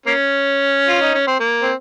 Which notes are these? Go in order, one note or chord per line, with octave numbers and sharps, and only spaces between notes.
A#3 C#4
F4
D#4
C#4
C4
A#3
C4